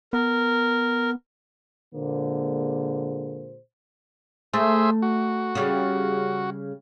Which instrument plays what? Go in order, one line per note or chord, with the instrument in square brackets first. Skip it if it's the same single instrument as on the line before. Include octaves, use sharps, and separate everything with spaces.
[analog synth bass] B3 [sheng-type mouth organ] A#4
[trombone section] A#2 D3 G#3 A#3 G#4 C5
[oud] A3 [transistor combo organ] G#4 C5 E5
[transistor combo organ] F#4
[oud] C#3 G3